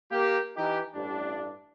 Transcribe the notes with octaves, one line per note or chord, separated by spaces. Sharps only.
A#3 G4
E3 D#4 G4
A1 G2 D4